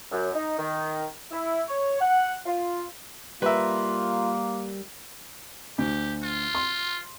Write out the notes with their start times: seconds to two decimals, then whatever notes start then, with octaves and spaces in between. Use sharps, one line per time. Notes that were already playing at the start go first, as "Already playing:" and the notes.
0.12 F#2
0.33 D#4
0.58 D#3
1.30 E4
1.68 C#5
2.01 F#5
2.46 F4
3.42 G3 A#3 F4 A#4 B4 E5
5.78 D2 G4
6.23 F4
6.55 C6